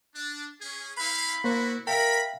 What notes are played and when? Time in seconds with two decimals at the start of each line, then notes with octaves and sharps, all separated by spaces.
0.14 D4
0.61 C#4 G#4
0.97 C4 E4 F5 B5
1.44 A#3 E4 F#4 C5
1.87 A#4 E5 F5 G5 B5